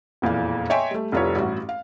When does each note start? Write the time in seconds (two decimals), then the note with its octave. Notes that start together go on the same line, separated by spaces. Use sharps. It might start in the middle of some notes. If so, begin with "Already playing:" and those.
0.22 E1 F2 A#2 E3 F5
0.70 C#5 D#5 E5 G5 G#5 C6
0.91 G3 A3
1.12 F1 C2 F4 B4 C#5
1.36 A1 G2 F#4
1.69 F5